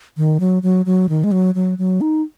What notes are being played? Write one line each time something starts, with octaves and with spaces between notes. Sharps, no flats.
D#3
F#3
F#3
F#3
D#3
G#3
F#3
F#3
F#3
D#4